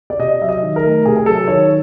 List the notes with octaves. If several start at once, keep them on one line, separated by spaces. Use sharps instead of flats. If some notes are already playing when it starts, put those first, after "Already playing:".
D5
C3 D#5
F#3 E5
D#5
D#3
A#4
A3
C3 G#4
A#4
F#3 A4
D#3 C#5